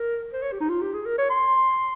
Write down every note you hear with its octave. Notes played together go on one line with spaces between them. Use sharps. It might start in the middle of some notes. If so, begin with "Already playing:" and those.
Already playing: A#4
C5
C#5
G4
D#4
F4
G4
G#4
A#4
C#5
C6